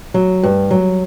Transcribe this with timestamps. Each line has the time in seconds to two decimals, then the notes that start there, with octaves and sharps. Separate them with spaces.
0.14 F#3
0.43 G2
0.71 F#3